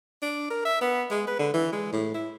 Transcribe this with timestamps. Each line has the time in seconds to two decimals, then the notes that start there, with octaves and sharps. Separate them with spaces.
0.22 D4
0.50 A#4
0.65 E5
0.81 B3
1.10 G#3
1.27 B4
1.39 D3
1.53 E3
1.73 G#3
1.93 A2
2.14 E4